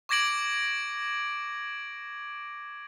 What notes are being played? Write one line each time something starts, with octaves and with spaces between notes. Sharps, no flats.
C#6 D6 G#6 A#6 D7 F#7